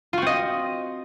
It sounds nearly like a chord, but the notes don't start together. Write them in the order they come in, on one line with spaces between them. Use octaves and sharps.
F4 F#4 C4 D#5